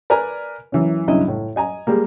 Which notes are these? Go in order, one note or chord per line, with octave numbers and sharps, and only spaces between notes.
A#4 B4 D5 G#5 A#5
F#2 E3 C#4
B1 G2 C#3 C#4 E4 D#5
A2
D#5 G#5 A#5
G3 G#3 A#3